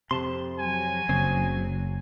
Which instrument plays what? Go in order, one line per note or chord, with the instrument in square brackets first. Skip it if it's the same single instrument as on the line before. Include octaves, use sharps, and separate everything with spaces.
[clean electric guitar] F2 A5 C6 [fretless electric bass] C3
[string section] F#3 [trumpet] G#5
[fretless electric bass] F#1 [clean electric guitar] C#3 C4